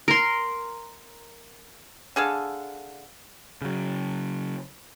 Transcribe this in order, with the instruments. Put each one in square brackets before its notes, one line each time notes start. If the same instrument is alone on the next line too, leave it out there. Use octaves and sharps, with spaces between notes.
[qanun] A#4 C6
[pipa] D3 G#4 A4 F5
[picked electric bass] C#3 F#3